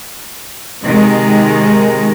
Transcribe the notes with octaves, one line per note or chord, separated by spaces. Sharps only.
C3 D#3 G#3